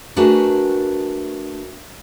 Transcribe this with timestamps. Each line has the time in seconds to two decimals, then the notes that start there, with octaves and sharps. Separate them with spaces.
0.16 A3 D4 F#4 G#4 A#4 B4